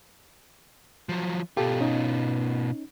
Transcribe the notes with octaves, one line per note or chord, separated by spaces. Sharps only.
F3 F#3
B2 F4 G4 A4
C#4 D#4